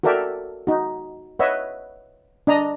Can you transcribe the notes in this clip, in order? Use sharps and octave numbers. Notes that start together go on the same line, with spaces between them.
F#4 A4 A#4 D5 E5 G5
D#4 F#4
B4 C#5 D#5 E5 F#5
D4 D#5 A#5